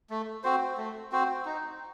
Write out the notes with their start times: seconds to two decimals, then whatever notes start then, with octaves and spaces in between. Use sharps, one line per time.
0.10 A3
0.44 C4 F#4 C5
0.77 A3
1.12 C4 F#4 C5
1.45 D#4